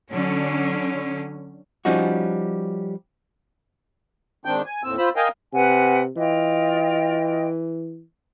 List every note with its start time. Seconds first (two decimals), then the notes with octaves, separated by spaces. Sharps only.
0.10 D3 F#3 C#4
1.85 F3 G3 C#4 D#4 F#4
4.45 G#2 D#3 C4 D4 G5 G6
4.66 G#5
4.83 D#2 A2 C4 E6
4.98 F4 C5 B5 E6
5.16 A#4 D#5 F5 G5 G#5
5.53 C3 B4 F#5 G#5
6.17 E3 F4 D#5 G5